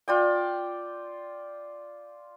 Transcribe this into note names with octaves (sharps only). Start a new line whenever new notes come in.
F4 D5 G5